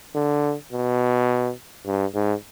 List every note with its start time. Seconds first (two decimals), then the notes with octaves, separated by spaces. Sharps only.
0.15 D3
0.72 B2
1.86 G2
2.14 G#2